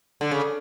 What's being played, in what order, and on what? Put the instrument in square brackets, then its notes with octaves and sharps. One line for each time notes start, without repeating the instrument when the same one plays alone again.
[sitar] D3
C#3